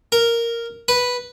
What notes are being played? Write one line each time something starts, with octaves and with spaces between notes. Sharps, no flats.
A#4
B4